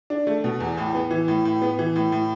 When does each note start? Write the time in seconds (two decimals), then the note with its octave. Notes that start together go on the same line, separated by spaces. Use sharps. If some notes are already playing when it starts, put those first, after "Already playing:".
0.10 D4
0.27 A3
0.44 B2
0.60 E2
0.78 A2
0.95 B3
1.10 E3
1.28 A2
1.45 A2
1.62 B3
1.79 E3
1.96 A2
2.12 A2